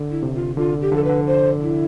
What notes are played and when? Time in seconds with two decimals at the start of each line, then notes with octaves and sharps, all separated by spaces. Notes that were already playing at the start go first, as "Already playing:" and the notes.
Already playing: D3
0.11 E4
0.23 C3
0.35 F4
0.57 D3 F4
0.81 G4
0.92 D3 F3 A4
1.04 B4
1.10 D3
1.26 C5
1.61 E4